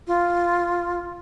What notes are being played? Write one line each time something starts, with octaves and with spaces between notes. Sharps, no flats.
F4